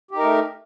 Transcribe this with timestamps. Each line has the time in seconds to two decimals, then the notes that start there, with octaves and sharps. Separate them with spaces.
0.11 G4
0.15 D#4
0.18 A#4
0.22 A3